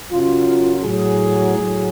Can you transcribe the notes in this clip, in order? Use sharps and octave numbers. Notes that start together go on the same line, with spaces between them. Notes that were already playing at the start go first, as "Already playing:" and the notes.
F#2 C#3 F#3 F4
A2 F#3 G#4
A2 F#3